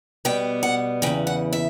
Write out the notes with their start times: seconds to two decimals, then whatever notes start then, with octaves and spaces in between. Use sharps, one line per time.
0.25 B2 G3 B3 G5
0.63 F#5
1.02 E2 C#3 E3 G5
1.27 F#5
1.53 E5